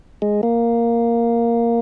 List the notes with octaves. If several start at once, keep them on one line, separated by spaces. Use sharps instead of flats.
G#3
A#3